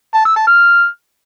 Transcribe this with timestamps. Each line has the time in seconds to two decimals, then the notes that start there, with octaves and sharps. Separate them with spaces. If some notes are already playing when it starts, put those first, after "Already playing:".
0.14 A5
0.25 E6
0.36 A5
0.47 F6